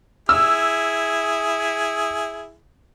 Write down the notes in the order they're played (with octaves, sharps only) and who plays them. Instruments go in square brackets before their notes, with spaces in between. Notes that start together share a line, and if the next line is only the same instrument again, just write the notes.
[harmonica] E4 G#4 [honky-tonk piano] E6